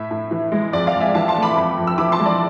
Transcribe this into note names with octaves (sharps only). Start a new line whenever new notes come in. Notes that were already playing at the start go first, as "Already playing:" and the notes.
Already playing: A2 E5
A2
E3
G#3
F2 D5
D5 F5
F2
E5 G#5
E3 F5 A5
A5 C6
A3
B5 D6
F2
F2
E6
E3 B5 D6
A5 C6
G#3
D5